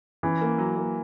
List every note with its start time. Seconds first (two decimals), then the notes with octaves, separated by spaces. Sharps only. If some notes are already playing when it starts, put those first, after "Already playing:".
0.23 E3 C#4
0.41 A#3
0.58 F#3
0.77 A#3